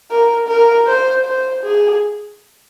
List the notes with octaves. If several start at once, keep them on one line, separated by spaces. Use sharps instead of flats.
A#4
A#4
C5
C5
G#4